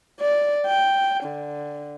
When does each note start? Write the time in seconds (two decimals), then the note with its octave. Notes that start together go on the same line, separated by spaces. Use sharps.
0.20 D5
0.66 G5
1.23 D3